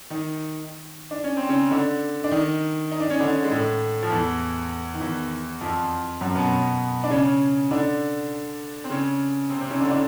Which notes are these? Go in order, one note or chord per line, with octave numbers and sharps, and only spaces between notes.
D#3 D#4
D4
C#4
C4
C#3 C#4
D3 D4
D4
D#3 D#4
D#4
D4
C#4
D3 D4
G#3
A2 A3
F3
E2 E3
D#3
E2 E3
F2 F3
F#2 F#3
B2 B3
D4
C#3 C#4
D3 D4
C4
C#3 C#4
C3 C4
C3 C4
C#3 C#4
D3 D4
D3 D4